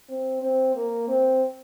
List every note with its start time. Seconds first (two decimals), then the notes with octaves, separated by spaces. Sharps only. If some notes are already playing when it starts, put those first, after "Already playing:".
0.09 C4
0.42 C4
0.75 A#3
1.08 C4